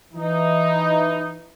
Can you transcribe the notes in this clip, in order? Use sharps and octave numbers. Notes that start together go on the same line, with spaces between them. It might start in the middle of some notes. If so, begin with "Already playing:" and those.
E3 D#4